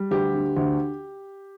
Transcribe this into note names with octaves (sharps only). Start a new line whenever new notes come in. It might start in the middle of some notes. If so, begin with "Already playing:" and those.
Already playing: G3
D2 G4
D3
D2